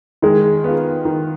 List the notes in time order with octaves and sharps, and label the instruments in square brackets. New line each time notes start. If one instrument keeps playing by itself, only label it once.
[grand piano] D#3 [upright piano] G#3
[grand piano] B3 F4
D#3